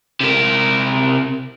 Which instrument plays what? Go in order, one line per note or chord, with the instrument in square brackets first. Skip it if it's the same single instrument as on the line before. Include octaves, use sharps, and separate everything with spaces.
[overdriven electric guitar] C3 A#4